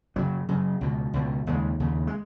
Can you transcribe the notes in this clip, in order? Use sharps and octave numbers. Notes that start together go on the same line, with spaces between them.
F#2 C#3 F#3
F#2 C#3
C#2 B2
C#2 B2
D#2 C#3 G#3
D#2 C#3
G#3